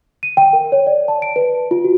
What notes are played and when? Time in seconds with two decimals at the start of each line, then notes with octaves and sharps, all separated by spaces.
0.23 D#7
0.37 G5
0.53 A#4
0.72 C#5
0.87 D5
1.08 A5
1.22 D7
1.36 B4
1.71 F4
1.84 F#4